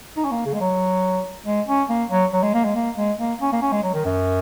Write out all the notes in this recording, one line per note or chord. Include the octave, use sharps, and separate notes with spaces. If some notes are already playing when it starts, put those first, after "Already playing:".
D#4
C#4
A#3
C#3
G#3
F#3
G#3
C#4
A#3
F#3
F#3
G#3
A#3
G#3
A#3
G#3
A#3
C#4
A#3
C#4
G#3
F#3
D#3
F#2